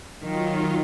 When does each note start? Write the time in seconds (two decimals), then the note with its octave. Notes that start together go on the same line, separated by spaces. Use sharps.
0.23 D#3 F#3 F4